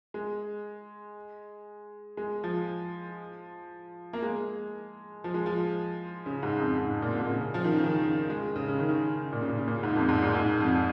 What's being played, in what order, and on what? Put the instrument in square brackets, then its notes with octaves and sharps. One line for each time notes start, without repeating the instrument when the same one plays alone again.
[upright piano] G#3
G#3
F3
A#3
G#3
F3
G#3
F3
C#3
G#2
F2
G#2
A#2
A#2
C#3
F3
D#3
C#3
D#3
G#3
C#3
C#3
D#3
C#3
A#2
C#3
A#2
C#3
A#2
G#2
F2
G#2
A#2
G#2
F2